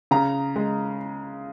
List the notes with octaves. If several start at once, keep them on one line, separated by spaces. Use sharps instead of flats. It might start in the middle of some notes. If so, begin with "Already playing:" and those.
C#3 A#5
G#3